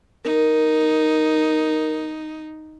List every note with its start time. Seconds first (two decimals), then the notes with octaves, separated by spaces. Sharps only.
0.25 D#4 A#4